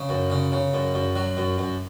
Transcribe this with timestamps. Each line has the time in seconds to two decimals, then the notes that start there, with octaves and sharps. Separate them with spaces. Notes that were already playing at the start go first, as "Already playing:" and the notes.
Already playing: C#3
0.09 F#2
0.30 C#3
0.52 C#3
0.74 F#2
0.94 F#2
1.16 F#3
1.37 F#2
1.58 F#2